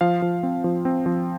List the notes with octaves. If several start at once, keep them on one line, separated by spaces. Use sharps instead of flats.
F3 F5
F3
C4
F3
C4
F3